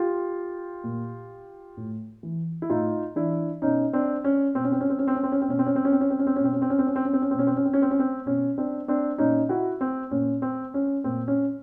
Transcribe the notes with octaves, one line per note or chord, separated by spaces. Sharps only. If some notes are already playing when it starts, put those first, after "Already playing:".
Already playing: F4 G4
A#2
A2
E3
E4
A2 D#4 F4
E3 D4 E4
B2 C#4 D#4
C4 D4
C#4
B2 C4
C#4
C4
C#4
C4
C#4
C4
C#4
C4
C#4
C4
B2 C#4
C4
C#4
C4
C#4
C4
C#4
C4
C#4
C4
C#4
B2 C4
C#4
C4
C#4
C4
C#4
C4
C#4
C4
C#4
B2 C4
C#4
C4
C#4
C4
C#4
C4
C#4
C4
B2 C#4
C4 D4
C4 D4
A#2 C#4 D#4
E4 F#4
C4
A#2 C#4
C4
C#4
A#2 C4
C#4